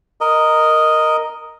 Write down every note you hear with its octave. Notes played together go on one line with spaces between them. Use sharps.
A#4 D#5